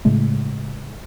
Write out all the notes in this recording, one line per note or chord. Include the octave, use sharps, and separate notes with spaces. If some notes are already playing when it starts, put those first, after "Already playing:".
A2 C#3 G#3 A3